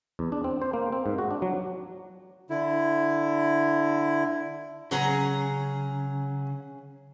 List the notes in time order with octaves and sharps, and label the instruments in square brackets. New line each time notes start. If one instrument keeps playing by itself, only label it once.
[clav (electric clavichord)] E2
D4
C4
C5
A#3
C4
G#2
F#4
D4
F#3
[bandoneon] D3 E4
[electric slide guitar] C#3 [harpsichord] F#3 [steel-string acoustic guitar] C#4 G#4 A#5